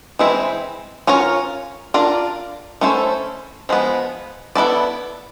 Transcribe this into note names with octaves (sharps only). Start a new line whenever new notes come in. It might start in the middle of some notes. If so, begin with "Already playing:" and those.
E3 G#3 C4 E4
C#4 F4 A#4 C#5
D4 F4 A#4 D5
A3 C#4 E4 A4 C5
F3 G#3 B3
B3 E4 A4 D5